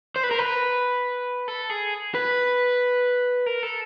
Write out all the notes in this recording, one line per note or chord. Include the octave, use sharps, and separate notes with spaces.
C5
B4
A#4
B4
A4
G#4
B4
A#4
A4